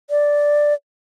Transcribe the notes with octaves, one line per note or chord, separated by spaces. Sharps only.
D5